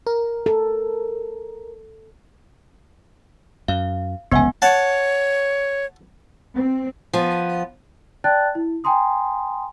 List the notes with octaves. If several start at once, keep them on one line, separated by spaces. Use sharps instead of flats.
A#4
A4
F#2 F5
F1 C#2 B3 F#5 G#5
C#5 F#5 A5
C4
F3 B3
D5 G5 A5 F#6 A6
E4
G5 G#5 A#5 C6 D#6